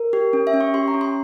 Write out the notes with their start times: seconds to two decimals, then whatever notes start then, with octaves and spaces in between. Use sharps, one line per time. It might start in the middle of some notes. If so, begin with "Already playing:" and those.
Already playing: A#4
0.13 G4
0.33 C#4
0.47 E5
0.54 C#4
0.61 C#6
0.74 G4 C6
0.88 A#5
0.94 C#4
1.01 C6